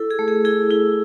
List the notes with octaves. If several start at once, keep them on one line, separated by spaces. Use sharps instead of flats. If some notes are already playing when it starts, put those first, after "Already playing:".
Already playing: E4 A4
G#4
A3
G#4
E4 G#4
E4